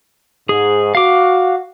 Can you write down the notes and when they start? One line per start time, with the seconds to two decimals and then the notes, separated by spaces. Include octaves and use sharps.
0.49 G#2 G#4
0.95 F#4 F5 D6